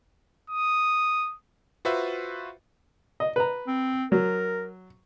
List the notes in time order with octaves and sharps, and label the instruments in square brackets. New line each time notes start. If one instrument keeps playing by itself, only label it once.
[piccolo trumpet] D#6
[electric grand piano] F4 F#4 B4 C5 E5
[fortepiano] D#5
B4 A#5
[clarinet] C4
[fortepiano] F#3 [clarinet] A#4